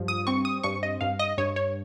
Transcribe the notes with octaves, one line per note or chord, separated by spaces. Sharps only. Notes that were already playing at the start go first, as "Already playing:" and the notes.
Already playing: G2 F3
D#6
C4 C#6
D#6
G2 C#6
D#5
G2 F5
D#5
G2 C#5
C#5